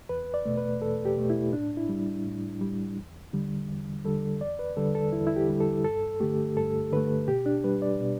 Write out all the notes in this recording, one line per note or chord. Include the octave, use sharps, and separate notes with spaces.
E2 B4
D5
B2 A3
B4
E2 A4
G4
B2 A3
E4
A2 D4
E4
G3
A2
G3
E2
D3 G3
E2
D3 G3 A4
E2 D5
B4
D3 G3 A4
A4
E2 E4
E4
G4
D3 G3
A4
G2 A4
D3 A3 G4
G2 A4
D3 A3 B4
B2 G4
D4
G3 B4
D5
B2